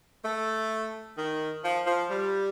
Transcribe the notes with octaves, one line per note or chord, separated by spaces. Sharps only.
A3
D#3
F3
F3
G3